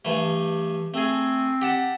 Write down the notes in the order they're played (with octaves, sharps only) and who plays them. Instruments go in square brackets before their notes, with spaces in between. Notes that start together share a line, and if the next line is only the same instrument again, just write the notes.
[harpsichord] G2 E3 A3 [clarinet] G4
[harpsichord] A3 G#4 [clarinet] C4
[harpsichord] G4 F#5 A5